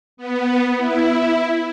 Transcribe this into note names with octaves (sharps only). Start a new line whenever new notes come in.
B3
E4